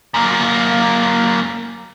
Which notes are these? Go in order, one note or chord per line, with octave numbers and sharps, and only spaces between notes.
F#2 A#3